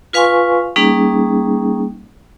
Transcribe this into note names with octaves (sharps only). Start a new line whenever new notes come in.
F4 B4 F5 G#5 C6 C#6
G3 A#3 C#4 D#4 G#4